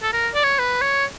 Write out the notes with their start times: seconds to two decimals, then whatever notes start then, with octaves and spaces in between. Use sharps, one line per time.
0.03 A4
0.13 A#4
0.35 D5
0.44 C#5
0.59 B4
0.82 C#5